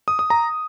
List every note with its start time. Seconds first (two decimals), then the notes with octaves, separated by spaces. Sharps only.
0.08 D#6
0.19 D#6
0.30 A#5